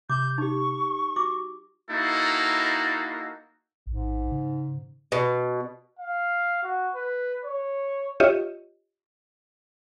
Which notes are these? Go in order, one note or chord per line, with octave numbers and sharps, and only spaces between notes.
C3 D6 G6
D#4 G4 C#6
F#4 D6
A#3 D#4 E4 F#4 A4
A1 G#2
C#3
B2
F5
F#4
B4
C#5
F4 G4 C#5 D#5 E5